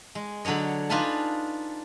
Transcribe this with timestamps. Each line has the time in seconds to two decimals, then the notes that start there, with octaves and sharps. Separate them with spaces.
0.15 G#3
0.45 D3 F#3 D4 C#5 D#5
0.90 D4 D#4 F4 B4 G#5 A5